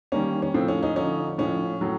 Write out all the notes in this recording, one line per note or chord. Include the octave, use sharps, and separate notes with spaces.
D#3 G3 A#3 C#4
C#4
A2 F3 A3 C4
C#4
C#4 D#4
D3 F3 A3 C#4 D#4
A2 F3 A3 C#4
A2 F#3 A3